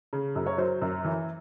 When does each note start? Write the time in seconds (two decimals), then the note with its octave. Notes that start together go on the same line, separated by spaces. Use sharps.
0.13 C#3
0.36 F#2
0.46 C#5
0.58 F#3 C5
0.82 F#2
1.05 E3